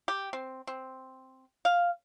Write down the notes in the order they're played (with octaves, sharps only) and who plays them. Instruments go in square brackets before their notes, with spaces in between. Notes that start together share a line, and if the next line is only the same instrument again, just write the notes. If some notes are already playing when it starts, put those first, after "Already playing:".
[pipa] G4
C4
C4
F5